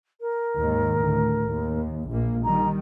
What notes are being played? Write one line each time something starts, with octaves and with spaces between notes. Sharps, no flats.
A#4
D#2 G#2 D#3
D2 A2
D#2
A#1 A#2 A#3
D#3 G3 A#5